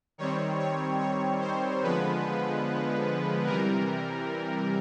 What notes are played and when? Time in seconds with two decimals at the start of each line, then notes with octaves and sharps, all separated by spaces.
0.18 D#3 G3 C4 C#5
0.60 C#5
0.99 C#5
1.41 C5
1.82 D3 F3 G#3 B3 B4
3.45 C3 E3 G3 A#4